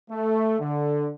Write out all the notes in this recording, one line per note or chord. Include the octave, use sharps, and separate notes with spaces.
A3
D3